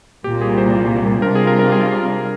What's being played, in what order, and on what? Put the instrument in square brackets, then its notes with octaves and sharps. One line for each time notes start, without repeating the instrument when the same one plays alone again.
[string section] C2 A#2 G3 [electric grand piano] G4
[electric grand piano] G#4
C5
[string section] C3 G3 D4 F4 [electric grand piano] A#4
[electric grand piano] G#4
A#4
A#4
G#4